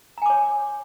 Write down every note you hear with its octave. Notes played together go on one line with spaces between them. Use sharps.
C#5 G#5 A#5 D6